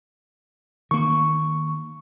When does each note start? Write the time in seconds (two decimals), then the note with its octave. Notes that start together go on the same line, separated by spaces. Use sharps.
0.91 D#3 A#3 C#6